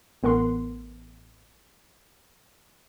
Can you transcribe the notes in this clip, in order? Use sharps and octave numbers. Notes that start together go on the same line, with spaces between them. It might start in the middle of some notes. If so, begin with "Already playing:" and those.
A1 B3 A#4 F#5 C6